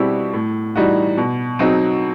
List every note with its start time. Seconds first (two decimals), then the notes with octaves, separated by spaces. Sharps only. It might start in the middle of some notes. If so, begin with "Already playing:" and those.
Already playing: B2 G3 C4 E4 G4
0.34 A2
0.76 E3 G3 D#4 F#4
1.17 B2
1.59 F#3 C4 D#4